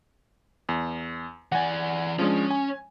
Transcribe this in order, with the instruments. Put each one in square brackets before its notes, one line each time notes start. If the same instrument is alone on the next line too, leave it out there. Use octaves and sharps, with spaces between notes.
[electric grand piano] E2
[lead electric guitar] E3 D5 [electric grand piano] F#5 G#5
[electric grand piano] F3 G#3 D4 [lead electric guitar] C#4
[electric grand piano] G#5